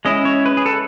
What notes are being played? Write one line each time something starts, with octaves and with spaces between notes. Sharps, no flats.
G#3 C#4 E4 D#5
C#5
B4
G#4
A4